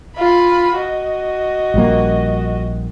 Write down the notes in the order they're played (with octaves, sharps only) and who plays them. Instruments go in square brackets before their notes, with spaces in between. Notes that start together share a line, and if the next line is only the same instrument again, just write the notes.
[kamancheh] F4 B5
F#4 D#5
[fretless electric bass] A#1 G3 A#3